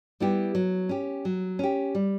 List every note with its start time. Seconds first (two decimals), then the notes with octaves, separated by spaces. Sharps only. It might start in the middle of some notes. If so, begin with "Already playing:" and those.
0.20 G3 B3 E4 G4
0.55 F#3
0.89 C#4 G4
1.25 F#3
1.59 C#4 G4
1.95 G3